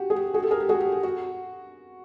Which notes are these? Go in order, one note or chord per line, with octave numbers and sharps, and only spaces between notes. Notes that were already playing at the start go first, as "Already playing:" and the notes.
Already playing: F#4 G4
G#4
G4
F#4 G#4
G4 A4
G#4 A#4
G4
F#4 G#4
G4
G4
F#4